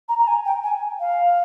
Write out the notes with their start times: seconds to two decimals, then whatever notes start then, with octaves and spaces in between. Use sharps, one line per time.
0.08 A#5
0.18 A#5
0.27 G#5
0.45 G5
0.63 G#5
0.99 F5